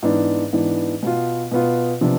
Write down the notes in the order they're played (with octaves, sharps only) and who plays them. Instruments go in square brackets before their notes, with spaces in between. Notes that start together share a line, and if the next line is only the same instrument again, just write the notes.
[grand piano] G#2 E3 B3 D4
G#2 E3 B3 D4
B2 B3 F4
B2 B3 F4
C3 F3 B3 D4